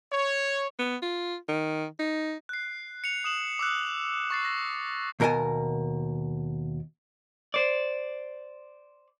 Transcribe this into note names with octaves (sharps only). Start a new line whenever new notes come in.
C#5
B3
F4
D#3
D#4
F#6 C7
C#7 F7
D#6 E7 F#7
D6 E6 F#6
C#6 A6 C7
A#6
D#2 B2 A#4 D#5 G#5 A5
C5 D5